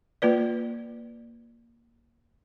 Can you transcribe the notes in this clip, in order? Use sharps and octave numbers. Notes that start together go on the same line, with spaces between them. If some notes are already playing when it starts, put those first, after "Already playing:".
A#3 F4 B4 D5